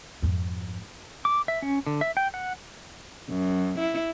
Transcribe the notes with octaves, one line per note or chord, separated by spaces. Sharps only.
F2 G#2
D6
E5
C#4
D3
E5
G5
F#5
F#2
E4